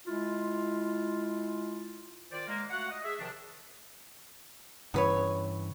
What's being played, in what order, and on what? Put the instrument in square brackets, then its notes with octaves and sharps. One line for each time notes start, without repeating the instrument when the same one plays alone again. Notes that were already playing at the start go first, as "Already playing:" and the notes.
[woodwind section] G#3 E4 F4
D#3 F4 C5 D5
G#3 A#3
A3 F#4 F5 F#5
D#5
G#4 E5
C3 D#3 F3 D4
[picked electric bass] G2 C#3 E3 [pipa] B3 B4 C#5